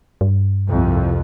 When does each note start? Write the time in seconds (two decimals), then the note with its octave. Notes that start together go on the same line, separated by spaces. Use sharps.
0.21 G2
0.67 C2 F2